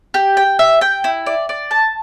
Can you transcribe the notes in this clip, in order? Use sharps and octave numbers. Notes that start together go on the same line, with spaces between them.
G4
G5
E5
G5
E4
D5
D5
A5